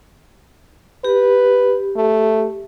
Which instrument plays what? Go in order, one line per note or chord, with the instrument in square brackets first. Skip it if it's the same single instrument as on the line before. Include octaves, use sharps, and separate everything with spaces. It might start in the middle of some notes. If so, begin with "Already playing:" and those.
[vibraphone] G4 [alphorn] B4
[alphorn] A3